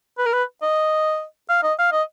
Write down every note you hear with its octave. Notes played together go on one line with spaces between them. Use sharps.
B4
A#4
B4
D#5
F5
D#5
F5
D#5